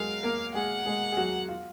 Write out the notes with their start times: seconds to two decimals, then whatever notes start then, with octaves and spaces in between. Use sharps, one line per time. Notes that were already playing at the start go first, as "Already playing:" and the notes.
Already playing: F#3 G#3 F#4 G#4 A#4 F5
0.23 A#3 A#4
0.54 G#3 G#4 F#5
0.86 G#3 G#4
1.12 G#4
1.17 F#3 F#4
1.48 F4